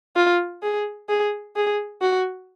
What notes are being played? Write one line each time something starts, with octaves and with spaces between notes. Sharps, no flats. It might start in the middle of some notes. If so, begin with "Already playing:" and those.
F4
G#4
G#4
G#4
F#4